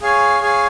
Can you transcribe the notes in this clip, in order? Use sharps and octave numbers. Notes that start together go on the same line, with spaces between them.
G#4 C#5 F5 G#5
G#4 C#5 F5 G#5